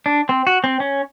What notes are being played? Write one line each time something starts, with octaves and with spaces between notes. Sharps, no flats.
D4
C4
F#4
C4
C#4